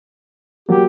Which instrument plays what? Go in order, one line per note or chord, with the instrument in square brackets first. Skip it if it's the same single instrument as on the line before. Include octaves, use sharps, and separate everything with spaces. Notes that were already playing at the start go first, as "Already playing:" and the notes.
[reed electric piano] F#3 A#3 [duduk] G4